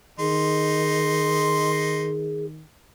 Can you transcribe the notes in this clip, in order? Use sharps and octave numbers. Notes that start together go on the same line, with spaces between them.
D#3 D#4 G#4 C6